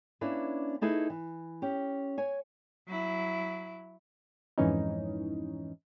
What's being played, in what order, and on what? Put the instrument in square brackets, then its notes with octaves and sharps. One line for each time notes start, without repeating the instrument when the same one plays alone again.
[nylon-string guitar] A#3 C#4 D4 E4 B4
A3 D#4 E4 G#4 B4
E3
C#4 G4
C#5 G#5
[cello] F#3 E4
[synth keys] F2 G#2 E3 C#4 D#4